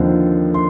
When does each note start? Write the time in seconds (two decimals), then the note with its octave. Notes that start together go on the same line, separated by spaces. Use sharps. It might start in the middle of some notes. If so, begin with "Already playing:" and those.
Already playing: D#2 D3 F3 C4 D#4
0.54 C6